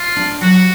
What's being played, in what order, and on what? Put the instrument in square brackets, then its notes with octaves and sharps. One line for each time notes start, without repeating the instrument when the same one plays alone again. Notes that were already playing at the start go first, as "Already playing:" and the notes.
Already playing: [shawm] F4
[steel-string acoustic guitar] D4
[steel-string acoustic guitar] F#3 [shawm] F#4